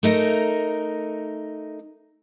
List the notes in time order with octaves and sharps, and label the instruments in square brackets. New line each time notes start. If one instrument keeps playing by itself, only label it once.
[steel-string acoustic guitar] A3 D#4 A#4